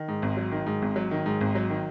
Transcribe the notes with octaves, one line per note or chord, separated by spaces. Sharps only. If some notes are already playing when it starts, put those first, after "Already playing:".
Already playing: D#3
G#2
G#1
F#3
D#3
G#2
G#1
F#3
D#3
G#2
G#1
F#3
D#3